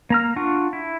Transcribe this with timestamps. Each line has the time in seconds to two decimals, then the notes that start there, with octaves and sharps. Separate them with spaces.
0.10 A#3 A#5 F6
0.36 D4 F4 F#5 C#6
0.73 E4